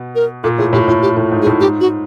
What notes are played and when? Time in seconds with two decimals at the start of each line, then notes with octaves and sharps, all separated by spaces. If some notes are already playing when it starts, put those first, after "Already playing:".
Already playing: B2
0.15 A#4
0.43 A#2 A4
0.58 A2 G#4
0.73 A2 G4
0.88 A2 F4
1.02 G4
1.17 A2
1.32 G#2
1.42 G#4
1.46 A2
1.60 G#2 G4
1.80 F#4